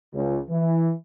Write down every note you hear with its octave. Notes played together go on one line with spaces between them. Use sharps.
C#2
E3